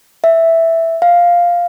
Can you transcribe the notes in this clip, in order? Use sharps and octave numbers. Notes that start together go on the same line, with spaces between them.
E5
F5